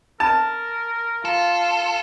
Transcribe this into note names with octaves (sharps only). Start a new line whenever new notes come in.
A#4 A5
F4 A4